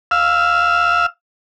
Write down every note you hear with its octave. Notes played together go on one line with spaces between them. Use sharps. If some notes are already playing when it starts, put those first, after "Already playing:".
F5 E6